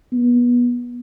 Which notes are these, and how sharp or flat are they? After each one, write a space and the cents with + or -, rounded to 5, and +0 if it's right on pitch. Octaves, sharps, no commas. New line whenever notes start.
B3 -25